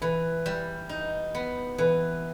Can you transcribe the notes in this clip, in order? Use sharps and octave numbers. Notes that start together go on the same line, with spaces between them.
E3 B4
G3
D#4
B3
E3 B4